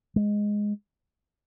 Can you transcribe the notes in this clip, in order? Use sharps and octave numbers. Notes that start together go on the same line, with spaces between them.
G#3